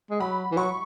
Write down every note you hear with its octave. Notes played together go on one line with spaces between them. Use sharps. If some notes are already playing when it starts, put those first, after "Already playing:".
G#3
F#3 B5
E3
F#3 C#6